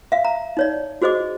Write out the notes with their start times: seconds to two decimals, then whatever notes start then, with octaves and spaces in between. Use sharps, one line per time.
0.12 E5 F5
0.25 A#5
0.57 D#4 C#5 D5
1.02 F#4 G#4 C5 D#5 D6